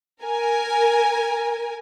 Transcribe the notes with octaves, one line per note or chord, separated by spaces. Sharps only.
A#4 G#5